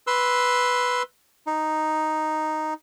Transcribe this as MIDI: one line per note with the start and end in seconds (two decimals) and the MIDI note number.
0.07 1.02 71
0.07 1.02 84
0.07 1.02 88
1.47 2.74 63